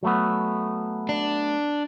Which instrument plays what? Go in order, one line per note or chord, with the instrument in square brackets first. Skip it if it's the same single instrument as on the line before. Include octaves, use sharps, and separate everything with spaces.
[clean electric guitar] F#3 A3 B3
[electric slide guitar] D4